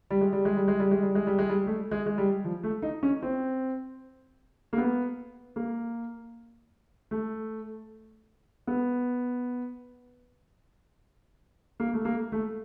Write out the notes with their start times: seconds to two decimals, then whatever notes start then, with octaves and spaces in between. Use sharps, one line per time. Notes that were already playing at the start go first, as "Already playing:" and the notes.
0.10 G3
0.21 G#3
0.33 G3
0.45 G#3
0.57 G3
0.68 G#3
0.80 G3
0.91 G#3
1.03 G3
1.15 G#3
1.27 G3
1.38 G#3
1.49 G3
1.67 A3
1.91 G#3
2.06 G#3
2.18 G3
2.45 F3
2.64 A3
2.82 D#4
3.03 C#4
3.23 C4
4.73 A#3
4.78 B3
5.56 A#3
7.11 A3
8.67 B3
11.80 A#3
11.94 A3
12.05 A#3
12.32 A3